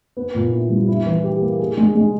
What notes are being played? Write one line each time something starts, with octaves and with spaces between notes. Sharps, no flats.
B3
A#2
E4
G3
E4
E3
G4
A#3
G#4
G#3
G#3